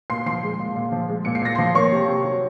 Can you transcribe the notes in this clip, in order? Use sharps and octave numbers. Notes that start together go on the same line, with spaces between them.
A#2 C6 C7
F3 C6 C7
G#3
A#2
A#2
F3
G#3
A#2 C#7
C7
A#2 A#6
F3 C6 C7
A#3 C#5 C#6
C3
C3
F#3